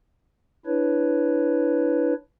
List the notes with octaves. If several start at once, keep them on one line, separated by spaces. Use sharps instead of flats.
D4 E4 B4 C#5